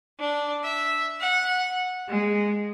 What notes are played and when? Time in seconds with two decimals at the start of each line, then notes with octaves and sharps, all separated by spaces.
0.20 D4
0.64 E5
1.20 F#5
2.08 G#3